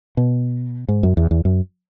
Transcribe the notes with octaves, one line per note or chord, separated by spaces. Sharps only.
B2
G#2
F#2
E2
E2
F#2